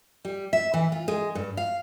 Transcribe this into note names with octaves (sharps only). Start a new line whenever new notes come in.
G3
E5
E3
F4
G#3
G2
F5